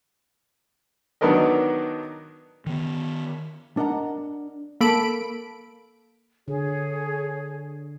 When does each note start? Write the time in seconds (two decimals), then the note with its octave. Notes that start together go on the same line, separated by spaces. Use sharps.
1.21 D#3 F#3 B3 D4 A#4 D#5
2.66 D#3 B3
3.77 D4 A#4 D#5 F#5 A#5
4.81 A#3 A4 B5 D7
6.48 D3 G#4 C#5